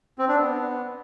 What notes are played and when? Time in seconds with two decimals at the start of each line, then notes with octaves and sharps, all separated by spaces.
0.19 C4
0.29 D4
0.39 B3